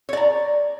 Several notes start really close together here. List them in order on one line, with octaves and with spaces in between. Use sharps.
C#5 D5 A#5